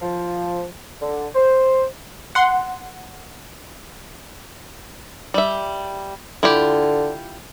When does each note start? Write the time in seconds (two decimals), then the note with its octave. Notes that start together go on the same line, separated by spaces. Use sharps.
0.01 F3
1.01 D3
1.35 C5
2.35 F#5 C6
5.34 G3 E5
6.43 D3 E4 F4 G4